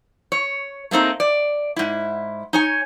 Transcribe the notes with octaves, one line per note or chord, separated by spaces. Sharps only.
C#5
A3 A#3 C4 D#4
D5
G#2 E4
D#4 C#5 G#5